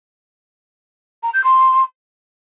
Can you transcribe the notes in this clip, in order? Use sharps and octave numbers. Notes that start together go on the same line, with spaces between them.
A#5
G6
C6